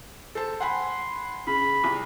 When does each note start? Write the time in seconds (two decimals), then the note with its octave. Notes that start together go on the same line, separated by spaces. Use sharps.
0.35 A4 C5 A5
0.61 F#5 G#5 B5 C6
1.47 C#3 B5
1.84 C2